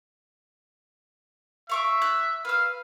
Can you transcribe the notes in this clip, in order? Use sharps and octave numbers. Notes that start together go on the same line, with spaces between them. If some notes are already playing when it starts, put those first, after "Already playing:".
E5 F5 C#6 D6
F#6
B4 F5 E6